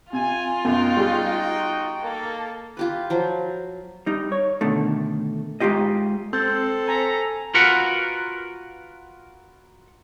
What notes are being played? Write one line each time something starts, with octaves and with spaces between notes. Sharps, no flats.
C3 F4 G#5
F#2 B3 D#4 F#4 G5
G3 G#4
A#3 A4
F4 G4 B4
F3 F#3
G3 D#4
C#5
B2 D3 D#3 A3
G#2 C#3 F4 G4 D#5
C4 A4 G6 A6
G#5 A#5 B6 C#7
F4 F#4 A#4 B4 F#5